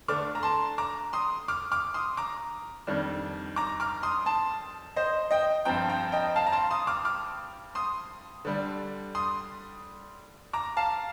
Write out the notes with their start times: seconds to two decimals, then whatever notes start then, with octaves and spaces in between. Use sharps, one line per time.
0.08 D3 A3 D4 D6 F6
0.35 A#5
0.43 A5 C6
0.78 A#5 D6
1.13 C6 D#6
1.48 D6 F6
1.72 D6 F6
1.94 C6 D#6
2.17 A#5 D6
2.87 F2 D#3 G3 D4
3.56 A#5 D6
3.80 D6 F6
4.03 C6 D#6
4.26 A5 C6
4.96 C5 D#5
5.31 D#5 G5
5.65 G2 F3 C4 G5 A#5
5.89 G5 A#5
6.12 D#5 G5
6.36 F5 A5
6.47 A#5
6.52 A5 C6
6.70 C6 D#6
6.87 D6 F6
7.05 D6 F6
7.75 C6 D#6
8.45 D3 G3 D4
9.15 C6 D#6
10.53 A#5 D6
10.77 F5 A5